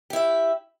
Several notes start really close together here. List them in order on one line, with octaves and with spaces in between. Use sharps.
G4 E4 E5